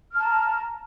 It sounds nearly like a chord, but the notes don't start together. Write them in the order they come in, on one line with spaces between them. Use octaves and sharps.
F6 A5 A#5